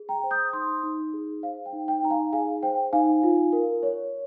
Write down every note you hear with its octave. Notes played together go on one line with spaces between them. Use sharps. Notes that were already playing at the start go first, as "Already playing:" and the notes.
Already playing: G#4
G5 A#5
C5
D#6 G6
D#4 C6 D#6
D#4
G#4
C5 F5
G5
D#4
G5
D#4 A#5
F5 G#5
G#4 F5 G#5
C5 G5
D#4 F5 G#5
F4
A#4
C#5